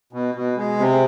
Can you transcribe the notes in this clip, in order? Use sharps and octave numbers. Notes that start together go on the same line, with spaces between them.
B2
B2
G#3
C3